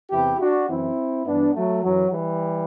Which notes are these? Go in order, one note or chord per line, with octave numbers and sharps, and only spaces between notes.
E2 C3 E3 E4 G4
D4 F#4
F#2 E3 C4 E4
G2 E3 B3 D4
F#3 A3
F#2 E3 F#3
E3 G3